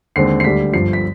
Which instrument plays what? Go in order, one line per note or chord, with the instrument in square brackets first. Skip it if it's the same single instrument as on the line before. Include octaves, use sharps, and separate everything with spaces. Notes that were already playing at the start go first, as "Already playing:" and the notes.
[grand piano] D#2 D3 G#3 C4 C7
C7
D2 D3 G3 B6
G1 G2 F3 C7
B6